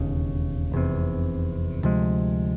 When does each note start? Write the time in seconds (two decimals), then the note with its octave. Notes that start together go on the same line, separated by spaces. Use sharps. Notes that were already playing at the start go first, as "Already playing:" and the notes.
Already playing: E1 D#2 C#3
0.72 F1 E2 C3
1.83 D2 C3 F3 G#3